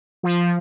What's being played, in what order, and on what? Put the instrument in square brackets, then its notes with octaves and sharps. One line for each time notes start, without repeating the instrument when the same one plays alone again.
[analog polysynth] F3